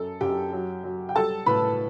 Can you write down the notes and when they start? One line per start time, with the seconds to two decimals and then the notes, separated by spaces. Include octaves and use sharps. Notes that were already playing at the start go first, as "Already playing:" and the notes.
Already playing: F#2 A4
0.21 F#2 G4 G5
0.53 F#3
0.84 F#3
1.09 G5
1.15 G3 A4 A5
1.46 A2 B4 B5